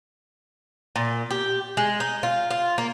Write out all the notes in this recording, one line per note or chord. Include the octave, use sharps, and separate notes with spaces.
A#2
G4
G#3
D#4
F4
F4
A#3